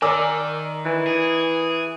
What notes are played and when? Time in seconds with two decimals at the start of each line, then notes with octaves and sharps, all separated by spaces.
0.02 D#3 A#4 D5 G#5 D6 E6
0.85 E3
1.07 G#4